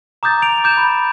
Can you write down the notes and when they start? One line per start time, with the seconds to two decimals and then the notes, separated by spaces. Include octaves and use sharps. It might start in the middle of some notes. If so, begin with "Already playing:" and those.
0.23 A#5 D6 D#6 G6 A6
0.42 A#5 D7 F7
0.64 D6 G6 E7
0.77 B5